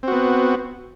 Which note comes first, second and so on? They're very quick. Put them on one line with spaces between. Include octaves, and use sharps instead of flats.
C4 F#4 B3